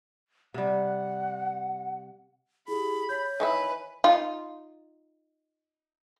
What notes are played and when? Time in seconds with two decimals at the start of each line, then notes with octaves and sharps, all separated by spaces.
0.54 C3 G3 F#5
2.68 E4 G4 G#4 B5
3.09 C#5 G6
3.40 D#3 E3 E4 B4 G#5
4.04 D#4 F4